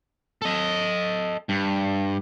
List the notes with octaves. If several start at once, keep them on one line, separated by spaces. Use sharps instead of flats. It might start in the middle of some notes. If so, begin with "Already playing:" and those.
A4 D#5
G2